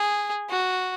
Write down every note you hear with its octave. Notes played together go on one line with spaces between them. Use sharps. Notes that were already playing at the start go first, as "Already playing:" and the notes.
Already playing: G#4
F#4